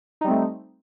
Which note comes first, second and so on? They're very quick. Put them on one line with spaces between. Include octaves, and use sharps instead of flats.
D#4 G3 C4 A3